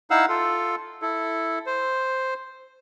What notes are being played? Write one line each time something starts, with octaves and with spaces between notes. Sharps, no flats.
D#4 E4 F5 F#5 E6
F4 A4
E4 A4
C5